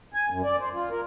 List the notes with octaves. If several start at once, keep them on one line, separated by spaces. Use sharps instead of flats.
G#5
F#2
D5
C5
F4
A#4